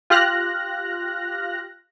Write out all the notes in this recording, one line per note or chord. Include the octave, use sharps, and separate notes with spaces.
F4 G4 F6 F#6 A#6